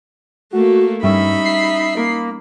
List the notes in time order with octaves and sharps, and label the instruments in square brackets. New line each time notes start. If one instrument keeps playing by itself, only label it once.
[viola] A3 A#3 [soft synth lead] F#4
[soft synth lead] G2 [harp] G3 C#4 E4 [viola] D#4 B5 [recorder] E5
[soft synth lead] C7
[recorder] A#3 [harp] A#4